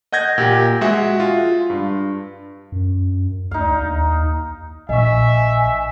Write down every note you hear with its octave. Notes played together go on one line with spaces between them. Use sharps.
D#5 F#5 G6 G#6 A#6
A#2 G4
G#3 F#4 E5 F#5
F4
G2
F#2
D2 D#4 F5
D#2
A#1 D#5 E5 G#5 C#6